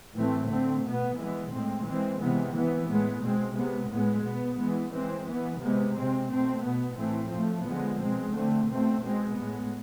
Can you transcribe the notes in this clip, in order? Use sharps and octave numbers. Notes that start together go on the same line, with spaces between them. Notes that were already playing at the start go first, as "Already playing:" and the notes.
A2 E3 A3 C4
D3 A3 C4
B2
B3
E3 G#3 B3
A2 G#3 C4
E3 G#3 C4
C3 E3 G#3 B3
E3 B3
A2 G#3 B3
B2 G#3 C4
C3 G#3 B3
A2 G#3 B3
B2 B3
E3 G#3 B3
E3 G#3 C4
E3 B3
C3 G#3 B3
C3 G#3 C4
B2 A3 C4
B2 B3
A2 E3 A3 C4
A2 F3 A3
D3 F3 G#3 B3
B2 G#3 C4
D3 A3 C4
B2 A3 C4
B2 G#3 C4
A2 G#3 B3